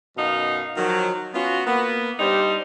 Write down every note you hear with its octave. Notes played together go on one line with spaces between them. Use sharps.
F#2 B2 D#4 F5
D#3 F3 F#3
B3 C#4 F4 F#4
A#3 B3
G2 G3 D#4 G4 C5